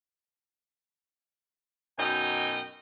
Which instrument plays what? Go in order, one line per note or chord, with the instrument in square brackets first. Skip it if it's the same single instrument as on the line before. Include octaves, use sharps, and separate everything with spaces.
[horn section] F#2 B2 D#4 D#5 G5